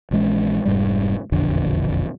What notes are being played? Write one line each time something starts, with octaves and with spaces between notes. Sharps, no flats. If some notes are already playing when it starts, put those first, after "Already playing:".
A#1 E3 G#3 C#4
F1 G#2 G3
E1 A#1 F2 D3